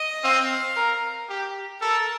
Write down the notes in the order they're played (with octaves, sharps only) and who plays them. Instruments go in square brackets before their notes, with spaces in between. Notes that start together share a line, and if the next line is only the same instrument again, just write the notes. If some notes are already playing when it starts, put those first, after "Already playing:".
Already playing: [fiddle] D#5
[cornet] C4 [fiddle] F5
[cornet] A#4
G4
[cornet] A4 [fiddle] A#4